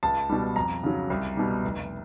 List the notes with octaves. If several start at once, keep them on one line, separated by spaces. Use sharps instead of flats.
C#2 A5
B2 G3
F2 A#5
C#3 F#3
C2
B2 G3
F1